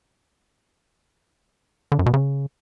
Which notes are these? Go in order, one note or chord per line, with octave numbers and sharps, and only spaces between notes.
D3
F#2
B2
C#3